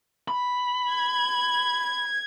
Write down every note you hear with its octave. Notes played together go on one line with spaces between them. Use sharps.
B5
G#6